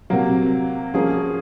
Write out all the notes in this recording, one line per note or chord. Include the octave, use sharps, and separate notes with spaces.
C3 F#3 A#3
F3 A#3 C#4 G#4